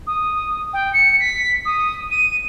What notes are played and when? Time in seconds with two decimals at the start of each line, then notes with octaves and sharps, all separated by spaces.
0.07 D#6
0.73 G5
0.93 C#7
1.19 B6
1.65 D#6
2.10 D#7